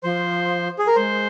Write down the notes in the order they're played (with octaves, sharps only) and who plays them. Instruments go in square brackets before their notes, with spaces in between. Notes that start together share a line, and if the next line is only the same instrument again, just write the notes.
[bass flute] F3 [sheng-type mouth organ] C5
[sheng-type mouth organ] G#4
A#4
[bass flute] G#3 [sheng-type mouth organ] C5